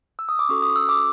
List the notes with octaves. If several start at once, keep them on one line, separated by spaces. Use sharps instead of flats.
E6
D#6
D6
C#4 F#4 A4 C#6
D#6
E6
D6